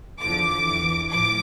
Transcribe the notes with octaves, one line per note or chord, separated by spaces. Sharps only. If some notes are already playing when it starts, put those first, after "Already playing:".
E2 D3 F3 D6
E2 E3
A2 F3 D6